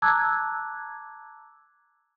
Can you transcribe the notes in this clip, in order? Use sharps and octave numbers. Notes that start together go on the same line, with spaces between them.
A5 A#5 D6 E6 F#6 G#6